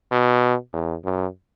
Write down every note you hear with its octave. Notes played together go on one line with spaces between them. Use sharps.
B2
E2
F#2